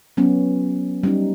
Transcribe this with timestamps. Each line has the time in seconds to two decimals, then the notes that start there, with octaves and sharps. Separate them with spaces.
0.17 F#3 B3 C#4
1.03 G3 C#4 D#4